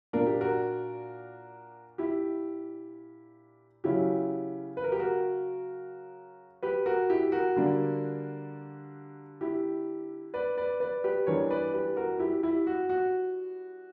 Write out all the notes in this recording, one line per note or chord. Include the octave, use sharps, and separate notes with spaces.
A#2 A#3 D4 A#4
G4
F#4 A#4
E4 G4
C#3 F#3 C#4 E4 G4
B4
A#4
G4
F#4 A#4
G4 B4
F#4 A#4
E4 G4
F#4 A#4
D3 G3 A#3 D4
E4 G4
B4 D5
B4 D5
B4 D5
G4 B4
E3 G3 B3 D4 A#4 C#5
B4 D5
G4 B4
F#4 A#4
E4 G4
E4 G4
F#4
F#4